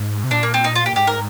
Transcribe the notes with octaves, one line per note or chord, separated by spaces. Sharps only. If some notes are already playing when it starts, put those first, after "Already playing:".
Already playing: G#2
C3
A#2 D4
A#3
C4
D#4
F4
G4
A#2
G#2 G4
A#4